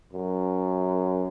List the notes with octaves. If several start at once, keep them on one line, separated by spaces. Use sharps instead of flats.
F#2